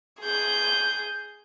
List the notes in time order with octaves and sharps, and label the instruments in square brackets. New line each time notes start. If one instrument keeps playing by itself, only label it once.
[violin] G#4 G6